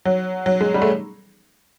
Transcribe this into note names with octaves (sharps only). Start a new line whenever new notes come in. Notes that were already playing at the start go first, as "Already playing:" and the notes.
F#3
F#3
G#3
G3
A3